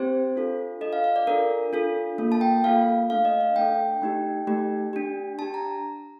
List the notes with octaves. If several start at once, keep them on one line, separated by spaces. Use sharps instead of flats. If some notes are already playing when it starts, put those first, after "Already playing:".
Already playing: C4 G4 C5
D4 F4 A4
D4 F4 A4 D#5
F5
F5
D5
D4 F4 A4 A#4
D4 F4 A4
A#3 F4 A4
A5
G5
A#3 F4 A4 F5
A3 D4 A4 F5
D#5
F5
A3 D4 A4 G5
A3 D#4 G4
A3 D#4 G4
D4 G4
D4 G4 A5
A#5